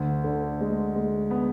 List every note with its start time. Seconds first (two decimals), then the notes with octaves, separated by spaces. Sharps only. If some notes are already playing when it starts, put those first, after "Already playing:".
Already playing: D2
0.24 D3
0.60 G#3
0.96 G#3
1.31 B3